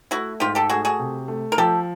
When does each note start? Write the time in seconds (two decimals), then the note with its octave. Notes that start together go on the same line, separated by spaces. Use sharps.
0.11 A3 E4 F#4
0.40 G#2 F4 G4
0.55 G4 A4
0.70 A3 F#4 G#4
0.85 F#4 G#4
0.99 C3
1.28 A3
1.52 A#4
1.58 F3 G4 A4